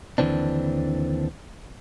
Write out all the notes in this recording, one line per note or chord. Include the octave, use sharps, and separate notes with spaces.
D#2 D3 E3 C4 D4